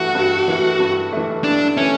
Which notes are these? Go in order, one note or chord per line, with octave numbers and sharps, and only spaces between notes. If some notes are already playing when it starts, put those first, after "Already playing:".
Already playing: G2 E3 A3 F#4
G2
E3 A3
G2
E3 A3
G2 D4
E3 A3 C#4